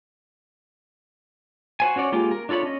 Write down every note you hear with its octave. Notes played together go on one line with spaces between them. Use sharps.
F#4 C5 G#5
C#4 F#4 C#5 D5
G#3 A#3 F4 G4
A#4
D4 F4 A4 C#5 B5
C#4 D#5